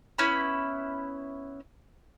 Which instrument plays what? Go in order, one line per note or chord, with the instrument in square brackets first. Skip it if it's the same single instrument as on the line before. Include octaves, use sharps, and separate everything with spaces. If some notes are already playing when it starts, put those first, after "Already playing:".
[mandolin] B3 C#4 E4 B5